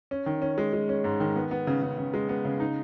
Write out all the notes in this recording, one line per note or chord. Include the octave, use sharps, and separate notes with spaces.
C#4
D#3
C#4
G#3
G#3
C#4
G#2
D#3
B3
B3
C#3
C#3
C#3
G#3
B3
C#3
D#4